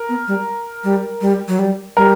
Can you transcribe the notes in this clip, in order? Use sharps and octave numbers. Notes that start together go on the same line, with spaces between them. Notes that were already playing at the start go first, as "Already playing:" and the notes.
Already playing: A#4
B3
G3
G3
G3
F#3
G3
G3 A#4